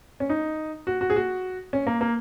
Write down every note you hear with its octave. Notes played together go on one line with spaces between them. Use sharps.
C#4
D#4
F#4
F#4
G#4
F#4
C#4
A#3
A#3